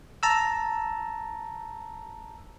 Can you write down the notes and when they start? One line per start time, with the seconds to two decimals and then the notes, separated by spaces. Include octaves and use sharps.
0.23 A5 A#5 E6